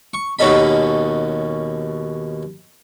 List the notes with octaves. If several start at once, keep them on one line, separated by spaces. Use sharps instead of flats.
C#6
D#2 B2 C#4 A4 D#5 B5